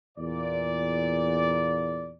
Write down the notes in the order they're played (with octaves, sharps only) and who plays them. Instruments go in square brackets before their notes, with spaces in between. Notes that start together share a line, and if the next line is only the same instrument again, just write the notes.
[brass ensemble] E2 A#2 D5